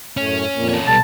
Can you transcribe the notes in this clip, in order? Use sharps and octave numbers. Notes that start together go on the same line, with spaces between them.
F#2 A2 A3 C#4
F2 A#2 A#3
C#4 A4
B1 G3 B3 A4 A5